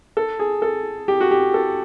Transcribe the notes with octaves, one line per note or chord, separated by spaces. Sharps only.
A4
G#4
A4
G4
F#4
G4
A4